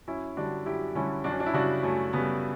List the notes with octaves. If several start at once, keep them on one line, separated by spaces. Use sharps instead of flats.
F#2 C#4 E4
D3 G3 D4 F#4
F#2 E4 G4
D3 G3 C#4 E4
F#2 D4 F#4
C#4
D4
E4
C#3 G3 D4 F#4
F#2 A3 C#4
C#3 G3 B3